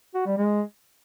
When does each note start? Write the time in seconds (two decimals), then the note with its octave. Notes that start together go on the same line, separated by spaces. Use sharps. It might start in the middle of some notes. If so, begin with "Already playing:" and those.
0.15 F#4
0.26 G3
0.38 G#3